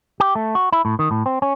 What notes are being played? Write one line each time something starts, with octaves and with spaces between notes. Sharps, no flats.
G4
A3
F#4
E4
A2
D#3
A2
C4
C#4